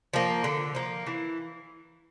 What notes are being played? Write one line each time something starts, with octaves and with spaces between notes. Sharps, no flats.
F3 A#3
D3
F3 A#3
E3